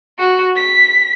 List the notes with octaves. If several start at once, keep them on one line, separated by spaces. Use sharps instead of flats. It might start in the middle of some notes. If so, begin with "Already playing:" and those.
F#4
B6